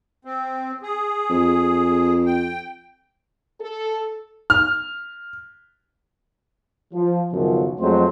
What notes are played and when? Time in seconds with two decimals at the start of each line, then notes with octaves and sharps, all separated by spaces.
0.25 C4
0.82 G#4
1.30 F2
2.26 G5
3.60 A4
4.50 F6
6.93 F3
7.32 C#2 F#2 B2 D#3 F3 F#3
7.80 F2 F#3 G#3 A3 C5